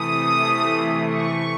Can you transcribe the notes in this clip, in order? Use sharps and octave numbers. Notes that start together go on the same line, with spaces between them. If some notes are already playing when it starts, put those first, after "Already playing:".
Already playing: C3 E3 A3 D#6
C#6